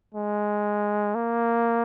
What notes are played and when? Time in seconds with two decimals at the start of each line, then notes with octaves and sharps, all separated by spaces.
0.14 G#3
1.15 A#3